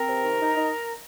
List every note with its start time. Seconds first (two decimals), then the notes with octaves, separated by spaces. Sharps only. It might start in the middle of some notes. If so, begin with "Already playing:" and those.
Already playing: C4 A#4
0.09 C3
0.24 D#3
0.40 D#4
0.55 D#4